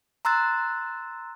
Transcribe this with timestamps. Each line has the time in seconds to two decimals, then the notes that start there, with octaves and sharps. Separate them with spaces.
0.25 A#5 C6 E6 F#6 A6